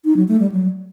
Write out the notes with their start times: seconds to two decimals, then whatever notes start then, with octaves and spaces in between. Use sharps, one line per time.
0.05 D#4
0.16 F#3
0.28 A3
0.40 G3
0.52 F#3